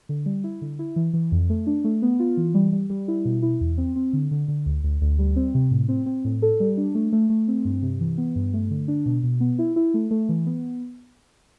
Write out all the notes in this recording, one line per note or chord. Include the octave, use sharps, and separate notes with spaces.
D3
G3
E4
D3
E4
E3
E3
F2
A3
D4
A3
B3
F4
E3
G3
G3
G3
E4
B2
E4
E2
C4
C4
D3
D3
D3
D2
D2
D2
G3
C4
C3
A2
C4
C4
A2
A4
G3
D4
A3
A3
A3
C4
G2
C3
E3
B3
G2
A3
D3
D4
B2
B2
B3
E4
E4
A3
A3
E3
B3